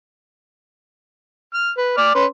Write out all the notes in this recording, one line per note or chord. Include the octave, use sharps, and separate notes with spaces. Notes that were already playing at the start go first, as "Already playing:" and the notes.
F6
B4
D5 D6 F6
C#4 B4 C6